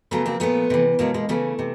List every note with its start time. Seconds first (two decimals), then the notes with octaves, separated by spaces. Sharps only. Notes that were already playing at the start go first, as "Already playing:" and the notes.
0.11 C#3 F#3 A3 B3
0.26 A#3 C4
0.40 A#2 F3 A3 B3
0.70 C3 E3
0.99 B2 F#3 G#3 A#3
1.14 G#3 A#3
1.29 C#3 E3 G3 A3
1.59 C3